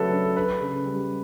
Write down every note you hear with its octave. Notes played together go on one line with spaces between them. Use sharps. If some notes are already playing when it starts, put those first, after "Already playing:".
Already playing: C#3 F#3 A3 A4 B4 C#5 E5
D4
D4 B4
C#3
G3